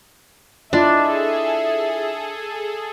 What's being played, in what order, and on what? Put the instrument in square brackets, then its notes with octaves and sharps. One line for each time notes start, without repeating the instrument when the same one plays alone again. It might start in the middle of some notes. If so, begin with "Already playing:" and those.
[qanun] D4 [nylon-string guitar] E4 F4 D#5 [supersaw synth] G#4 A4 [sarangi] E5